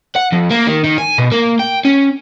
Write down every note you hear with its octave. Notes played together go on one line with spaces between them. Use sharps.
F#5
F2
A#3
D#3
D#3
G#5
B2
A#3
G5
C#4